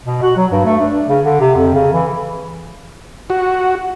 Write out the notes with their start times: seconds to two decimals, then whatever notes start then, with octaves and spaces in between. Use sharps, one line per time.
0.04 B2
0.22 F#4
0.37 F#3
0.52 G2
0.65 A3
0.80 D4
1.08 C#3
1.24 D3
1.40 C3
1.56 F2
1.74 C#3
1.93 E3
3.30 F#4